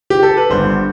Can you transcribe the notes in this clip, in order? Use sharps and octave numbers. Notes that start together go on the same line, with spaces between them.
G4
A4
B4
G1 G2 D3 C5